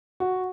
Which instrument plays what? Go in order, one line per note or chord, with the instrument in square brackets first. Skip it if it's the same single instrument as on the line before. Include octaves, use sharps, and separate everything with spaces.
[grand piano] F#4